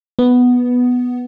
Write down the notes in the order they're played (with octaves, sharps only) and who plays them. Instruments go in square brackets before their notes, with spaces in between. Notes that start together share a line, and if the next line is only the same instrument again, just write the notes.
[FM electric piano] B3